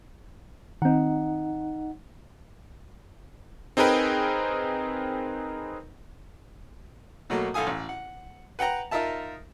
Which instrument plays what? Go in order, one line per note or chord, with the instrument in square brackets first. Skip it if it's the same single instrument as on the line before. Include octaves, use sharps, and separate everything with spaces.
[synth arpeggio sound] D#3 C4 [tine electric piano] D#4 F#5
[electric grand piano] C4 D#4 G#4 A#4 B4 G5
[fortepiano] B2 F#3 A3 A#3
B1 A4 F5 G#5 D#6
A1
F#5
B4 F#5 G5 A#5
D#4 F4 A#4 E5 A5